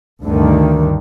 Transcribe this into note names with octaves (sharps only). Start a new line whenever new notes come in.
D2 G2 D3 D#3